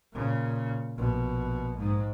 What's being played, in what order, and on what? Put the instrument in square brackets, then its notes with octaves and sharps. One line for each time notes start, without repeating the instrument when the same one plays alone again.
[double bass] A#2 C#3
A#1 B2
G#2